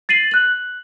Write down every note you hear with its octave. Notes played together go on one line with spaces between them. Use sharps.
A6 C7 D#7 F#7
F#6 F#7